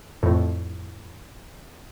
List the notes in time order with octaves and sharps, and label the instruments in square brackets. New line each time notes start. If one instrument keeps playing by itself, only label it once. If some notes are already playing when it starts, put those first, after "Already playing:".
[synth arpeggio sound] F2 A2